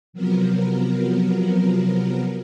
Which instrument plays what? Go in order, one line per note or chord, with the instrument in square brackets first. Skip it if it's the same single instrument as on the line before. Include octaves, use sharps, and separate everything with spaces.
[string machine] C3 F3 F#3 B3 A#4